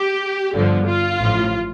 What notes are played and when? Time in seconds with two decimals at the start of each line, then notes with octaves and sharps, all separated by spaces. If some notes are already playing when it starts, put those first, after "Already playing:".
Already playing: G4
0.53 G1 G2 D3 F3
0.86 F4
1.20 A1 A2 F3